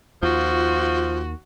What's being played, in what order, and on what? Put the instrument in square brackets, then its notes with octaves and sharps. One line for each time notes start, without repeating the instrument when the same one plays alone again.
[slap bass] D#2 [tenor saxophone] F3 [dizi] F4 [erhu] F#4